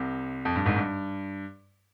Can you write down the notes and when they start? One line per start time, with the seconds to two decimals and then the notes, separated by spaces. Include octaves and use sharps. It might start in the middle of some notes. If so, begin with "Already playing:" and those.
Already playing: C2 C3
0.45 F2
0.56 G2
0.66 G#1 G#2
0.77 G2